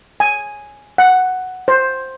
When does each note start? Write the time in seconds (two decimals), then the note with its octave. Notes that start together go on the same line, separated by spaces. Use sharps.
0.20 G#5
0.98 F#5
1.68 C5